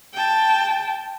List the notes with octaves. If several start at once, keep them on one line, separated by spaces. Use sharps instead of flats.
G5 A5